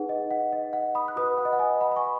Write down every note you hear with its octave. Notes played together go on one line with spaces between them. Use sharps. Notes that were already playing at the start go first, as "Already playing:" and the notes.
Already playing: D#4 G#4 B4 F#5
D#5
F#5
D#5
F#5
B5 D#6
F#6
F#4 B4 B5 D#6
F#5
D#5
F#5
D#5 G#5
F#5 B5
B5
G#5 C#6